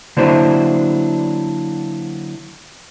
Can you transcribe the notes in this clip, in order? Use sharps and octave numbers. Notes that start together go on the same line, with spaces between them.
D3 F#3 A#3 D4 E4 C5